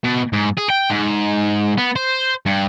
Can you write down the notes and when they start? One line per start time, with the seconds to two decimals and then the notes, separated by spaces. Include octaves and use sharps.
0.04 B2
0.33 G#2
0.58 G#4
0.70 G5
0.90 G#2
1.78 B3
1.96 C5
2.46 G2